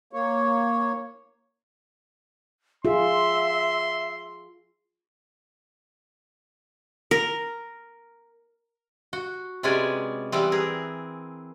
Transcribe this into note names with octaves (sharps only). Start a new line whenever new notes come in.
A#3 C#5
F4 G#4 E5 C6
A#4
F#4
C3 G#3 B3 C#4 D5 G#5
E3 G3 B3 C4
G#4 A#4